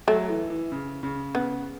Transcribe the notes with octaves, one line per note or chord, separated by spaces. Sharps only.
F#3 A3
E3
E3
C#3
C#3
C#3 B3